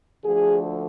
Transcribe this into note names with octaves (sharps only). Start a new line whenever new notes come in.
D2 D3 F3 G#4